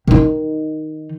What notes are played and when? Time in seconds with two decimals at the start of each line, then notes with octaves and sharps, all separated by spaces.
0.08 D#3 D#4